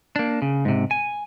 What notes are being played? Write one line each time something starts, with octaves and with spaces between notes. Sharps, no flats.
A#3 D4
C#3
G#2 C3
G#5